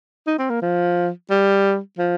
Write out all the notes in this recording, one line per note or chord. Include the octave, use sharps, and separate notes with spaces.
D#4
C4
A#3
F3
G3
F3